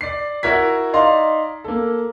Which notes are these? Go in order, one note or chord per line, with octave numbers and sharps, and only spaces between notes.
D5 C7
E4 F#4 A#4 G#6 B6
D#4 D5 F5 A#5 C6
A#3 A4